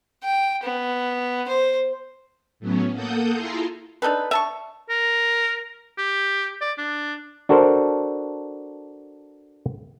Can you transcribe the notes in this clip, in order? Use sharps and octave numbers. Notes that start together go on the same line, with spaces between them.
G5
B3
C5
A2 F#3 B3 C#4
A#3 A4 F#5 D#6 G6
E4 F4 G#4 A4 A#5 C6
D4 D#4 A4 B4
E5 A5 C#6
A#4
G4
D5
D4
D4 F#4 A4 A#4 C5